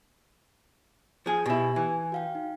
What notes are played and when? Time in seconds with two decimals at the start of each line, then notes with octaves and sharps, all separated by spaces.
1.26 F3 G#4
1.46 B2 E4 G4 G#5 A#6
1.76 E3 G#5
2.12 F#4 F5 G5
2.35 D#4